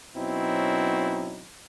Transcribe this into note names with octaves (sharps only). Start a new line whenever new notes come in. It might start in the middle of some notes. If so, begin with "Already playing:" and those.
B2 F#3 C4 C#4 D#4 E4